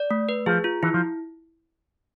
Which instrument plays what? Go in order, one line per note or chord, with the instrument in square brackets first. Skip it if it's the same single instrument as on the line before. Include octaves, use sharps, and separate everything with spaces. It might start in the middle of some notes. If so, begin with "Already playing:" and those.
Already playing: [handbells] D5
A3
B4
[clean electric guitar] F3 [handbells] G#4
[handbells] F4
[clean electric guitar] E3 [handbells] E4
[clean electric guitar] F3